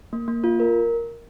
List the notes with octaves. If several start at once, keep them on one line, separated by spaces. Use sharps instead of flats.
A#3
A#3
F4
A#4